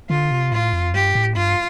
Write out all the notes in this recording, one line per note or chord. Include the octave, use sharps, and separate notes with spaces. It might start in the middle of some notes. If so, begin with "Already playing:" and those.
D3 F4
C3
A2 F4
F2
G2 G4
A2
G2 F4